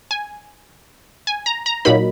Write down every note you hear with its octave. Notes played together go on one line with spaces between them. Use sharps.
G#5
G#5
A#5
A#5
A#2 F#3 A#3 D#4 B5